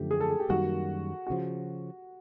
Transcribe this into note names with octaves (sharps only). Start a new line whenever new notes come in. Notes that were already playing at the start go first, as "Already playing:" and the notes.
Already playing: F#2 D3 F3 A3 G4
G#4
A4
G#4
G4
F#2 D#3 G3 A#3 F#4
F#4
C#3 F3